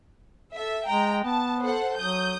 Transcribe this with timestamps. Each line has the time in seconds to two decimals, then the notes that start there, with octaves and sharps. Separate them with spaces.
0.54 A4 E5
0.88 G#3 G5 A#5
1.24 B3 A5
1.61 A4 C5 F#5
1.96 F#3 D#6 G6